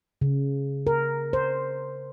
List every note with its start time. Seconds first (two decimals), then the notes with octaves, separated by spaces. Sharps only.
0.21 C#3
0.87 A#4
1.33 C5